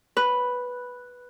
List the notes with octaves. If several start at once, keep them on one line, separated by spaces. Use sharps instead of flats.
B4